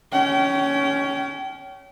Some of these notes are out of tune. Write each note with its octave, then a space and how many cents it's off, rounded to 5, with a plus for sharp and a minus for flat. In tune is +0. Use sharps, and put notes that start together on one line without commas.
C#4 +15 G5 -30